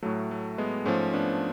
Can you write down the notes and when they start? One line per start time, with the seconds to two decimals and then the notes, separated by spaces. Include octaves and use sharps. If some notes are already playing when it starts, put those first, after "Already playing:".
0.03 A2 F#3 A3
0.31 A3
0.58 G#3 B3
0.85 G#2 F3 A3 C#4
1.14 B3 D4